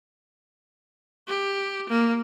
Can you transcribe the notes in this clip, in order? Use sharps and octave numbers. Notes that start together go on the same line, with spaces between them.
G4
A#3